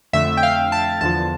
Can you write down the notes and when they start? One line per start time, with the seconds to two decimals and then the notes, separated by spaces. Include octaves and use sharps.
0.13 F2 D3 A3 E5
0.37 G5
0.43 F5
0.72 A5
1.01 E2 D3 F3 A5